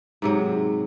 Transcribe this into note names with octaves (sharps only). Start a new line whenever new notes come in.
G#2 C3 F#3